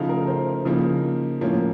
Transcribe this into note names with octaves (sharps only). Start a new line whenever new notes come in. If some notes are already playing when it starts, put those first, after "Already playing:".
Already playing: C#3 F3 A3 D#4 F5
A#4
C5
C#3 F3 A#3 D#4
A2 F3 A#3 C#4